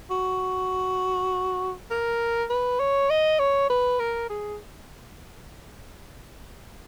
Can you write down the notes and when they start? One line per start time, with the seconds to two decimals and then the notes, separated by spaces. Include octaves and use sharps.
0.10 F#4
1.91 A#4
2.50 B4
2.80 C#5
3.10 D#5
3.39 C#5
3.70 B4
4.00 A#4
4.30 G#4